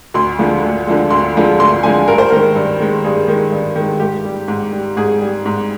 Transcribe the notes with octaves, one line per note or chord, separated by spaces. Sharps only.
D2 C6
D3 F3 G#3
D2
D3 F3 G#3
D2 C6
D3 F3 G#3
D2 C6
D3 F3 G#3 G#5
G2 A#4
C5
D#3 G#3 A#4
G2
D#3 G#3
G2 G#4
D#3 G#3
G2
D#3 G#3
G#2 G4
G3
G#2
G3
G#2 G#4
G3
G#2